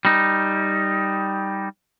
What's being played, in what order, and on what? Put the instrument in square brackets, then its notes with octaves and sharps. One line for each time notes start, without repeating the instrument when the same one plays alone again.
[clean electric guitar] G3 D#4